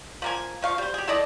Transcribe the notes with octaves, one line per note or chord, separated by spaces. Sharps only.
F3 A#3 G#5
F3 F5 C#6
G3 C5
G4 G#4
E4 A4 D5 D#5